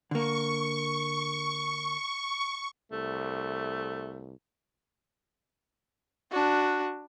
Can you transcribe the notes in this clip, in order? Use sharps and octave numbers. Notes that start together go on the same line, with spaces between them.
D3 A#3 C#6
C2 A3
D4 F#4